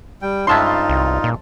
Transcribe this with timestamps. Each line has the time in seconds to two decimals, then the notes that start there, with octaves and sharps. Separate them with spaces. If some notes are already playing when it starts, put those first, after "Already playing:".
0.22 G3 G5
0.47 G2 G#3 C#4 D#4 F4 E5 A5 C6
0.89 C2
1.24 A#2